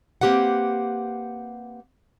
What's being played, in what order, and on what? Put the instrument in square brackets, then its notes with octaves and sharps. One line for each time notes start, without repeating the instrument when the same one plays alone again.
[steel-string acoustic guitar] A#3 C4 G4 B4 F#5